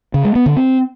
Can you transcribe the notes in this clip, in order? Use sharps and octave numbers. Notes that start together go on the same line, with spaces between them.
C#3
G#3
B3
D3
C4